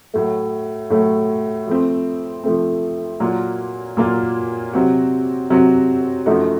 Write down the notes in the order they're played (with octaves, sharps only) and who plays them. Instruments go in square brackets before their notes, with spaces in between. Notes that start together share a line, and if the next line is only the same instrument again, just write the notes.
[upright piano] A2 F#3 A3
A2 F#3 A3
F3 A3 C4
F3 A3 C4
A#2 F#3 A#3 F4 A#4
A#2 F#3 A#3 F4 A#4
C3 F#3 C4 F#4
C3 F#3 C4 F#4
F#2 F3 A3 D#4 F#4